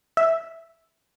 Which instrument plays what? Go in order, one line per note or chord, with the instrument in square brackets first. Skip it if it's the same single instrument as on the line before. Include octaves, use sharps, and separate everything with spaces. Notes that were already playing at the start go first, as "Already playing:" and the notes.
[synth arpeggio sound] E5